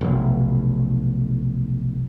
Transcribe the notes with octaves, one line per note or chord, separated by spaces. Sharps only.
F1 B1